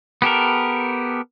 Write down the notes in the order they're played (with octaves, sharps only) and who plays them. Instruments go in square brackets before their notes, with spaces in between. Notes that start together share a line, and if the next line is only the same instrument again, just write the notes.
[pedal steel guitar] B3 G4 A4 A#4